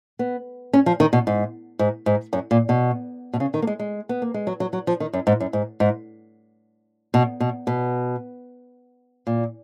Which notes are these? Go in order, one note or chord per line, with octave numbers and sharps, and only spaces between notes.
B3
C#4
F3
D#3
B2
G#2
G#2
G#2
F#2
A#2
B2
B2
C#3
D#3
A#3
G#3
G#3
B3
A#3
G#3
F#3
F#3
F#3
F3
D#3
F#2
G#2
F#2
G#2
G#2
B2
B2
B2
A#2